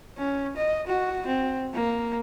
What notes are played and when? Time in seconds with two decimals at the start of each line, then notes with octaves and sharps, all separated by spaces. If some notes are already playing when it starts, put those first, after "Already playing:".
0.18 C#4
0.57 D#5
0.87 F#4
1.27 C4
1.73 A#3